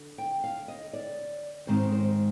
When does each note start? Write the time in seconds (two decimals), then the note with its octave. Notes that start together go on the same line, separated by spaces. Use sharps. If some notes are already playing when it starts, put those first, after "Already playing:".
Already playing: D3
0.18 G5
0.44 F5
0.68 D#5
0.93 D5
1.67 G#2 D#3 G#3 C4 D#4 C5
1.92 C5